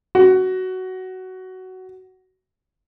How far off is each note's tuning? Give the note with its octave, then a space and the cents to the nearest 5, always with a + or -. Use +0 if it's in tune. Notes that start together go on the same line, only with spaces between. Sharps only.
F#4 +10